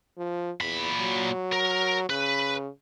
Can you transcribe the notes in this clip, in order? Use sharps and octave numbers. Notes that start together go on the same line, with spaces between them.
F3
E2 A#2 B5
F#3
A#4
C#3 B4